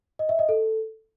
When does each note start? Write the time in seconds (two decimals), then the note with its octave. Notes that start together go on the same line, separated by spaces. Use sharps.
0.19 D#5
0.29 E5
0.39 D#5
0.49 A4